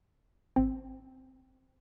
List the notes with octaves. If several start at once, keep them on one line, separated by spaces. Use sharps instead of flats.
G#1 C4